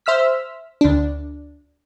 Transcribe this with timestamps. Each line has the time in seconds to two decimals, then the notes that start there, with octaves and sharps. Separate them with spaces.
0.06 C5 E5 E6 F6 B6
0.81 D2 D4